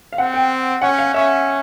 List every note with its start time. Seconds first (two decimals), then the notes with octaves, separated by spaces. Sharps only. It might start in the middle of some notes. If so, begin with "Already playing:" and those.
0.13 F5
0.18 C4 F#5
0.34 G5
0.82 C#4 F#5
0.98 F5
1.14 C#4 E5